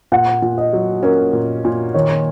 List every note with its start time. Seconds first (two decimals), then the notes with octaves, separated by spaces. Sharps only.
0.12 A#2 F#5
0.42 A#2
0.58 D#5
0.73 F#3
1.03 C#4 A#4
1.33 A#2
1.65 A#2
1.94 D#3 C#5